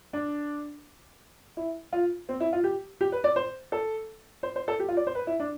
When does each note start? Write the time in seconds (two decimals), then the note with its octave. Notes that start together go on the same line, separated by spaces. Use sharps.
0.13 D4
1.57 E4
1.93 F4
2.29 C4
2.40 E4
2.53 F4
2.64 G4
3.01 G4
3.12 B4
3.24 D5
3.36 C5
3.72 A4
4.43 C5
4.56 C5
4.68 A4
4.80 G4
4.88 F4
4.97 D5
5.07 C5
5.15 B4
5.27 E4
5.40 D4